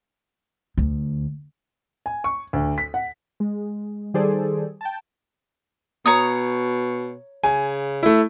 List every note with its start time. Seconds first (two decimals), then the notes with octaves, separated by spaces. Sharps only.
0.78 D2
2.06 G#5
2.24 C#6
2.53 D2
2.78 B6
2.94 F#5
3.40 G#3
4.14 D#3 G3 G#4 A4 C5 D5
4.81 G5 A5
6.06 B2 C#5 A#5 D#6
7.44 C#3 G#5
8.03 A3 E4